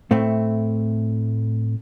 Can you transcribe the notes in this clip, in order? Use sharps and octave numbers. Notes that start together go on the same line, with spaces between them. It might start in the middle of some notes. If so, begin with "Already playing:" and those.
A2 A3 C4 E4